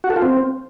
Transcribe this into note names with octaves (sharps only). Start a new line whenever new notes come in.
F#4
A4
F4
C4